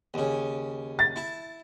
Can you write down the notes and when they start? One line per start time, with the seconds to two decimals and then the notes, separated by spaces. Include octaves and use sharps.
0.14 D#2 C#3
0.99 A6
1.16 E4 A5